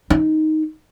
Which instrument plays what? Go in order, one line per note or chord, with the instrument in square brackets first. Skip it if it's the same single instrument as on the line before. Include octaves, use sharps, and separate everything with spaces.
[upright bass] D#4